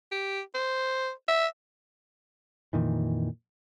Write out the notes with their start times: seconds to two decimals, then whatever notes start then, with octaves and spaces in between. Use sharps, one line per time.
0.12 G4
0.55 C5
1.28 E5
2.73 F2 A#2 D#3 E3